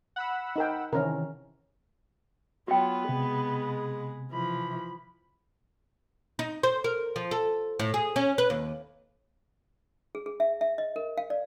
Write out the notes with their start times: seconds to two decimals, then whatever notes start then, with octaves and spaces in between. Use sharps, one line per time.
0.16 F#5 B5 E6
0.56 D#4 A#4 G5
0.93 C3 D#3 E3 C#4 A#4
2.68 F#3 B3 F4 F#4 B4 G5
3.09 C3 G#3 G#4
4.33 E3 F3 B5
6.39 D#4
6.63 C5
6.84 A#4
7.16 F3
7.31 A4
7.79 A2
7.94 G#4
8.16 C#4
8.38 B4
8.50 D#2
10.15 G#4
10.26 G#4
10.40 E5
10.61 E5
10.78 D#5
10.96 A#4
11.17 F5
11.30 D5